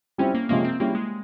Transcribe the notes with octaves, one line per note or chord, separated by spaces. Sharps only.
G3 C4 C#4 E4
A#3
C3 F3 G#3 A#3 C#4 F4
C4
G3 A#3 C#4 E4
G#3